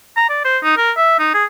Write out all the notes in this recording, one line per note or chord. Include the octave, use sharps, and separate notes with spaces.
A#5
D5
C5
D#4
A#4
E5
D#4
G#4